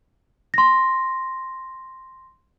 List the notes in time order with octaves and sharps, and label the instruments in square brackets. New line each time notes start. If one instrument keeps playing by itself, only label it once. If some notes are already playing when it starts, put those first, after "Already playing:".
[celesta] C6 A#6